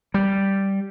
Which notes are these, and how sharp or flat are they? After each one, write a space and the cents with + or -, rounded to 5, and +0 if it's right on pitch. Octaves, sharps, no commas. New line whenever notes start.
G3 -5